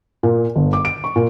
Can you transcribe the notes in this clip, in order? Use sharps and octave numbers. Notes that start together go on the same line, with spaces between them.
A#2
G1
D6
D7
C#6
A#2